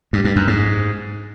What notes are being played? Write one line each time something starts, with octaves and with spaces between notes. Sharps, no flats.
G2
G2
F#2
G#2